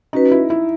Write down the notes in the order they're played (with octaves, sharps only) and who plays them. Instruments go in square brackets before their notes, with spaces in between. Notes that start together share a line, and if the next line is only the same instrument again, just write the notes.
[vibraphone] C#4 F#4 B4 [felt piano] D#4
[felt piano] E4
E4